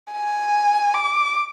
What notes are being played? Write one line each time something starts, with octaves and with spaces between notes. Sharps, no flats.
G#5
D6